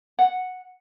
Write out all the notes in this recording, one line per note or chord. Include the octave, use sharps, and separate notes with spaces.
F#5